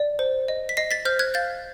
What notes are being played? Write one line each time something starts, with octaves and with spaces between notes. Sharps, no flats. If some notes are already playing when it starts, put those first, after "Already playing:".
Already playing: D5
C5
D#5
B6
D#5 A#6 C7
A6 B6
C5 F6 G6
F#6 G#6
F5 G6 A6